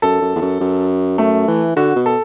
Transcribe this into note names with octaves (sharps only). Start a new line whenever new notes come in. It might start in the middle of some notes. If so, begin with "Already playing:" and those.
F#2 A4
F#2
E2
F#2
F#2
F#2 A3
E3
D3 F#4
B2
A4